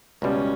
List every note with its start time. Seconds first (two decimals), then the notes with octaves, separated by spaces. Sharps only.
0.22 C#2 B2 G3 C#4